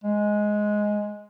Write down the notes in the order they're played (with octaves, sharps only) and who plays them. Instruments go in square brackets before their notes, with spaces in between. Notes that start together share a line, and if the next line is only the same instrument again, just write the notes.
[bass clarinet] G#3